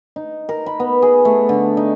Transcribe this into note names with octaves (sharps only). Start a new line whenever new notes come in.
D#4
A#4
B5
B3
G#4
A3
D3
D#4